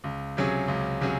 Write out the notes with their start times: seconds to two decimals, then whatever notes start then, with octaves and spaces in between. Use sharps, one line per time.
0.04 C#2
0.37 C3 F#3 C#4 G#4
0.68 C#2
1.01 C3 F#3 C#4 G#4